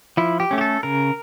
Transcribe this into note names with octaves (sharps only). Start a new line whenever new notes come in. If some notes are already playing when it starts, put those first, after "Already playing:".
F3 E4
G4
A3 C#4
G4
A4
C#3 A#4